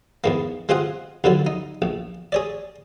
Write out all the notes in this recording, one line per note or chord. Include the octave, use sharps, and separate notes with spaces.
E2 G#2 A#3
G#3 C4 F4 G#4 F#5
D#2 D3 F3 F#3
D#4
A#1
G#4 C#5 D5